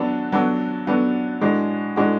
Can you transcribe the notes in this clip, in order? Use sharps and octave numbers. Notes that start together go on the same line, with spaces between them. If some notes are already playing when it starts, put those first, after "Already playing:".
Already playing: F#3 B3 D4 F#4 A4
F#3 B3 D4 F#4 A4
F#3 B3 D4 F#4 A4
A2 G#3 D4 F#4
A2 G#3 D4 F#4